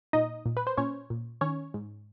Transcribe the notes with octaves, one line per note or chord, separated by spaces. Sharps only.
A#2 D#4 D#5
A#2
B4
C5
A#2 C#4 C#5
A#2
D#3 C#4 C#5
G#2